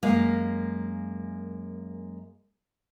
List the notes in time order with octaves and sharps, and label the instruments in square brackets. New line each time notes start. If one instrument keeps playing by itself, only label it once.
[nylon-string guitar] F#2 G#3 A#3 F5